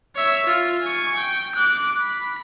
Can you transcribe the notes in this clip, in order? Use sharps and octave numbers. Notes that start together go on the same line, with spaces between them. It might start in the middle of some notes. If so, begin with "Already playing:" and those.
C#5 E5
F4
G#5 C#6
G5
D6 F#6
B5